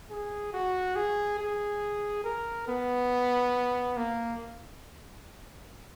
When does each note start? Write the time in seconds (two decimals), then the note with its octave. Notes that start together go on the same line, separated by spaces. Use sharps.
0.10 G#4
0.53 F#4
0.96 G#4
1.39 G#4
2.24 A#4
2.68 B3
3.97 A#3